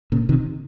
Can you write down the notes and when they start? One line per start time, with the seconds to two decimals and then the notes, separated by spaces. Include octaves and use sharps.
0.12 A#2 C#3
0.29 C3 D#3